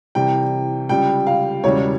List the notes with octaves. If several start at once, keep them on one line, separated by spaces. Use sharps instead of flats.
C2 C3 E3 G3 G5
C#2 C#3 G3 G5
F5
E1 E2 C#3 E3 G3 C#5